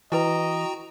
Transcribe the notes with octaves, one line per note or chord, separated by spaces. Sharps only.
E3 E4 F#4 B4 D#5 G5 A#5